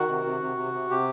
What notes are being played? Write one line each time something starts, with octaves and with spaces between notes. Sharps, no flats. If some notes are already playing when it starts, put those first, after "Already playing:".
Already playing: D#3 F#4
C3
C3
C3
C3
C3
C3 G4